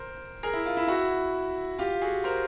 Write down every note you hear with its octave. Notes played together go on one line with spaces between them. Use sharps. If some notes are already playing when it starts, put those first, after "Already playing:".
Already playing: A#4 C5
G#4 A#4
E4
F4
E4
E4 F#4
F4 G4
F#4 G#4
A#4 C5